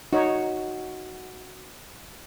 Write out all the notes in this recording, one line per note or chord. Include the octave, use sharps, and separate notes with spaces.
D#4 F#4 C#5